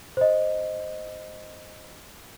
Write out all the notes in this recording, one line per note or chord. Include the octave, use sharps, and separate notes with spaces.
C5 D#5